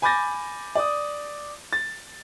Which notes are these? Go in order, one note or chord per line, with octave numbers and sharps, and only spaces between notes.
G#5 B5 D6 G6 A6 A#6
D5 D#6
A6